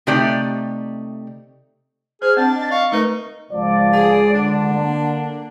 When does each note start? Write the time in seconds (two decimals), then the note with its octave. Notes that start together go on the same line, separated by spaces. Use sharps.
0.07 C3 A3 D#4 G4 D5
2.22 G#4 C5 F6
2.37 C4 D4 A5 A6
2.55 D#5
2.71 F5 C#6
2.92 A3 D#4 A#4 B4
3.53 C#2 F3 D5
3.93 G#4
4.34 D3 D4
4.70 A#3